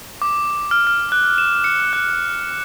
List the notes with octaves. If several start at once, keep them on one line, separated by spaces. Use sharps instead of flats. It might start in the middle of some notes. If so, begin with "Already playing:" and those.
D6
F6
F6
F#6
E7
C#7
F#6